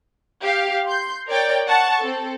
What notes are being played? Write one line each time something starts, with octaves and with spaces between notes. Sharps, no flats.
G4 F5
C6 G6
A#4 C#5 D5 G5
F#5 A5 C#6
C4 A4